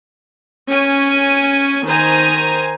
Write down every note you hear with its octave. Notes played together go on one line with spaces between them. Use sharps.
C#4 G#5
D#3 C5 G#5 A#5